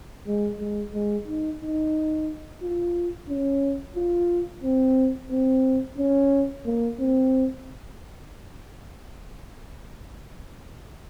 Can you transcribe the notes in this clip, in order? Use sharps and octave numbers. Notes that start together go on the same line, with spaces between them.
G#3
G#3
G#3
D#4
D#4
F4
C#4
F4
C4
C4
C#4
A#3
C4